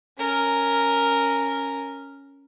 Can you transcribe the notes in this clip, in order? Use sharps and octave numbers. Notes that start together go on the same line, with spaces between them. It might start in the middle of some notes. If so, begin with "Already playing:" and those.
C#4 A#4